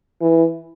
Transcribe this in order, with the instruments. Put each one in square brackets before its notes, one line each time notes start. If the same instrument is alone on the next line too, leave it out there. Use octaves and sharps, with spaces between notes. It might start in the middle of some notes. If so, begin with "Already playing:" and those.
[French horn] E3